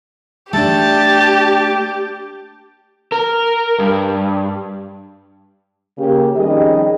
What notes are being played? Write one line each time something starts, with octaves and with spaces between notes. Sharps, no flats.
A3 D4 G4 A5
A#4
G2
C#3 A#3 G4
F2 D#3 G3 C#4 G#4 D#5